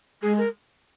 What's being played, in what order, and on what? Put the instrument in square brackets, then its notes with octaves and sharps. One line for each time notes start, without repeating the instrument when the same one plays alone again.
[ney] G#3 [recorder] G#4
[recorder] A#4